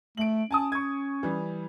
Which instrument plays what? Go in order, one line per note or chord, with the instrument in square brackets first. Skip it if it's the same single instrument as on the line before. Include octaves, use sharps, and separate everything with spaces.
[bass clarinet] A3 [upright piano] D7 F#7
[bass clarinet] C#4 [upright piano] G#5 A5 D#6
[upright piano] C#6 G#6
E3 G3